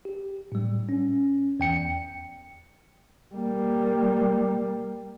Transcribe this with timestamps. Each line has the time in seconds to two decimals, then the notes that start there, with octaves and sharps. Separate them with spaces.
0.05 G4
0.52 A2 G3
0.89 C#4
1.60 E2 G5 C#7
3.35 G3 A#3